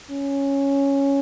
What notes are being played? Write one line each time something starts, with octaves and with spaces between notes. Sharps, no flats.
C#4